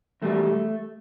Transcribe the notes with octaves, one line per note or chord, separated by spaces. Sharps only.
E2 B2 G3 A3